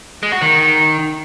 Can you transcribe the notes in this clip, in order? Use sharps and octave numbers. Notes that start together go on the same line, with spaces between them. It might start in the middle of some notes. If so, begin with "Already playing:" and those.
G#3
F#4
D#3